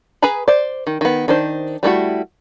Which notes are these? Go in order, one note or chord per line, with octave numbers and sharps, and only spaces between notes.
G#4 B4 G#5 A#5 B5
C5 D5
D#3
D#3 B3
D#3 D4 C5
G3 A3 E4 F#4